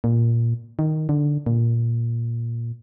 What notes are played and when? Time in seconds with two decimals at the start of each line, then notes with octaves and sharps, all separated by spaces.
0.04 A#2
0.79 D#3
1.09 D3
1.46 A#2